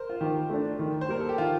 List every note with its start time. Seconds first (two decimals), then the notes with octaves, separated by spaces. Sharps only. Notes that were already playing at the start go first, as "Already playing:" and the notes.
Already playing: A#4 C5
0.09 F4
0.21 D#3 G4
0.50 A3 D4
0.79 D#3
1.01 C5
1.09 G3 A#3 A#4
1.20 A4
1.29 G4
1.38 D#3 F4